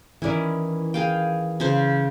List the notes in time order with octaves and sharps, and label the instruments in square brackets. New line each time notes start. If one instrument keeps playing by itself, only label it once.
[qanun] D#3 C#4 E4 [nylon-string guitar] E3 D5
[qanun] G#4 F5 G5
C#3 C5